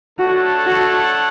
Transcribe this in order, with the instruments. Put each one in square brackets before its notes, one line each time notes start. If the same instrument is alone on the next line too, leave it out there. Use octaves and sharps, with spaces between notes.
[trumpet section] A3 D4 A4 C#5 F#5 [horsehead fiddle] F#4
[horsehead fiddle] F#4